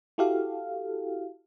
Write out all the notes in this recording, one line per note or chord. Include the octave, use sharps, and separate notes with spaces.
E4 F#4 G4 A4 F5